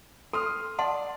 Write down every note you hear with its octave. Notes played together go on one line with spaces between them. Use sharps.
A4 C6 D#6 F6
D5 F#5 A5 C6